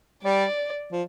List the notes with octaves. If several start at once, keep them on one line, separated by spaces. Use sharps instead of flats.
G3 D5
F3